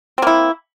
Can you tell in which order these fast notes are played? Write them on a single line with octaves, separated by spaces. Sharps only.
C4 A#3 E4